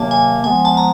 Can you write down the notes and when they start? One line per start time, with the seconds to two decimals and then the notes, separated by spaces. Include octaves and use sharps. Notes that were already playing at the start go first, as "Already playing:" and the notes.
Already playing: C3 D#3 F#3 A#3 G#5 A5
0.11 G#5
0.44 F3 G#3 B3 G#5
0.65 A5
0.77 A#5